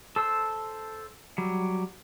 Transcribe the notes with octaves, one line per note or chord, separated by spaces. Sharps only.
A4 C5 E6
F#3 G3